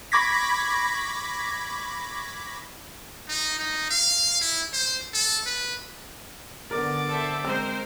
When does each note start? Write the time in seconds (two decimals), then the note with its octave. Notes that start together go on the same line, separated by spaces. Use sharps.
0.12 B5 C#6 D6 G#6 A#6 B6
3.29 D#4
3.59 D#4
3.90 F5
4.41 E4
4.73 C5
5.14 A4
5.46 B4
6.71 D3 B3 A#4 D5
7.08 A4 C5 E5
7.44 G#3 C4 A#4 C5 E6